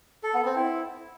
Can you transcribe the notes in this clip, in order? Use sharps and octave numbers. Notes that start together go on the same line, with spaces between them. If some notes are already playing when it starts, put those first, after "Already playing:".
A4
B3
C4
E4